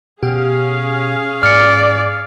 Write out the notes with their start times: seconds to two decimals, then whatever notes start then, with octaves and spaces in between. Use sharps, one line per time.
0.23 B2 C#4 G4 G#4 F5
1.43 G#2 D5 F6 C#7